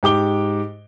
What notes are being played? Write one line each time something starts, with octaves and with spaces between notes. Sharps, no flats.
G#2 G4 D6 G7